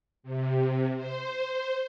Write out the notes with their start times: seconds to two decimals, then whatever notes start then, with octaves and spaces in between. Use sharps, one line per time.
0.23 C3
0.96 C5